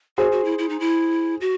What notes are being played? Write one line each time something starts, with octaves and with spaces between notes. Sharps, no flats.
F#4 G#4 C5
F#4
E4
E4
D#4
E4
F#4